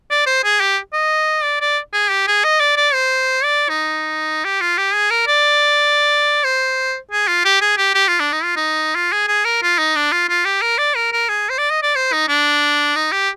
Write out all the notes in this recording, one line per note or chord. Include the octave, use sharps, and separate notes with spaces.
D5
C5
G#4
G4
D#5
D5
D5
G#4
G4
G#4
D#5
D5
D5
C5
D5
D#4
G4
F4
G4
G#4
A#4
D5
C5
G#4
F4
G4
G#4
G4
G4
F4
D4
D#4
F4
D#4
F4
G#4
G#4
A#4
F4
D#4
D4
F4
F4
G4
A#4
D5
A#4
A#4
G#4
C5
D5
D#5
D5
C5
D#4
D4
D#4
G4